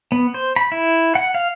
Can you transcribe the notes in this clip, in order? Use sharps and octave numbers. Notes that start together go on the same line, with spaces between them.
B3
C5
B5
E4
F#5
F5